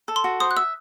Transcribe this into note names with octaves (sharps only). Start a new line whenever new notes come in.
A4
C6
F#4
C5 D#6
F#6
E5 E6